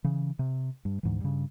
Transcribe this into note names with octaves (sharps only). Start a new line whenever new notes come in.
C#3 E3
C3
G2
D2 G#2 E3
G2 C#3